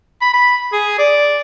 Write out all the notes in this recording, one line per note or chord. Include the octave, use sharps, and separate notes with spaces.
B5
B5
G#4
D5